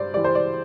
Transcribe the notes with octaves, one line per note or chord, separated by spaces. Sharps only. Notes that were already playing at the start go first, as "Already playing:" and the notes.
Already playing: G2 C5 D5
E3 G3 D5
C5
D5